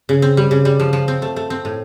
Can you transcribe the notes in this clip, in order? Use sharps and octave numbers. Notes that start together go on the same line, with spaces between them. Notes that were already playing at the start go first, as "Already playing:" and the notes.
C#3
C4
G3
C#3
G3
F3
F3
C4
A3
A3
C4
A2